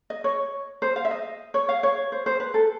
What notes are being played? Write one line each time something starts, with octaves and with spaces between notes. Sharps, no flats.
D#5
C#5
C5
F5
E5
D#5
C#5
F5
C#5
C5
C5
B4
A4